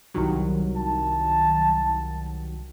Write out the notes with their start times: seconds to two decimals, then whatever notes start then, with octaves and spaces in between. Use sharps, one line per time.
0.14 C2 D#3 F#3
0.76 A5